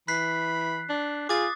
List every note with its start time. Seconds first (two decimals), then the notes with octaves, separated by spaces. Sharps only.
0.08 E3 B5 F#6 B6 C7
0.89 D4
1.29 F4 G#4 D6 D#6 A6